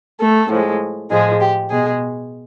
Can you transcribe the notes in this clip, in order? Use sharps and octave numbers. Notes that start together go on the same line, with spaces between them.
A3 A4
A2 F3 G#3
A2 F3 G#3 G#4
G4
B2 G#3 G#4